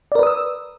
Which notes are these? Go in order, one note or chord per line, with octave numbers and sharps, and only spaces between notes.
A#4 B4 D5 D#6 E6